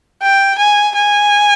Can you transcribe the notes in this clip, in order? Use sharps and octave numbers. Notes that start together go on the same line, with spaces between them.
G5
G#5
G#5